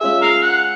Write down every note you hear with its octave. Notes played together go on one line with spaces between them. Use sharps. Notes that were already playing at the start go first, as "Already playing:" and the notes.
G#3 C#4 F4 G#4 E5
A#4 F5
F#5